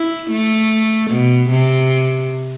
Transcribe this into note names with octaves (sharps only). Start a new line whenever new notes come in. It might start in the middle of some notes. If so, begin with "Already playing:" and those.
Already playing: E4
A3
B2
C3